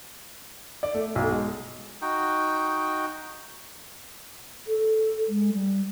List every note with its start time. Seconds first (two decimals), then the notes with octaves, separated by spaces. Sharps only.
0.83 D5
0.95 A3
1.16 B1
1.32 G#3
2.02 D#4 F#4 G5
4.67 A4
5.28 G#3
5.53 G3